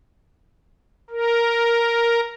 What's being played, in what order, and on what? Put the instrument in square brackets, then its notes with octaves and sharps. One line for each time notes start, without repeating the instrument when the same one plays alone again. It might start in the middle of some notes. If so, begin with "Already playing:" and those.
[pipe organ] A#4